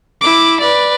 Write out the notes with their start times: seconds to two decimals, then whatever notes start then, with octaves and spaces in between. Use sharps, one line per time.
0.21 E4 D6
0.60 B4 D5